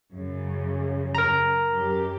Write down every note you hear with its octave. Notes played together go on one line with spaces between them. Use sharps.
F#2 C#3
A#4 A#5
F#2 G4